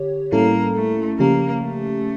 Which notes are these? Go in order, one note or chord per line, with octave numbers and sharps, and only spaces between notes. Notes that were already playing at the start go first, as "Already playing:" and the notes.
Already playing: D3 G4 C#5
A2 G3 A#3 C#4 E4 A4
A3
C#3 F3 A#3 C#4 G4
A3